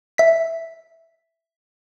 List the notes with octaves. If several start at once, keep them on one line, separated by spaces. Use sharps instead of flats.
E5 B6